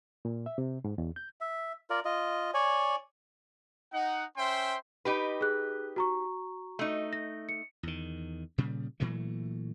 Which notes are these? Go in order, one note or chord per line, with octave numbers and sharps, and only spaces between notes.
A#2
E5
C3
G#2
E2
G6
E5
F4 A#4 D5
F4 D#5
C#5 D5 G#5
D#4 F#5
C#4 C5 E5 G5 C6
D#4 G4 B4
G#4 F#6
F#4 A#5 C#6
A3 D#4
A#6
C#7
E2 D#3
A#2 C#3 G3
A#2 E3 F#3 A3